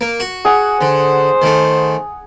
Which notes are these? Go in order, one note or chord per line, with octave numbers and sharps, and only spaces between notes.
A#3
F#4
G#4 F#5
D3 C5
D#3 A3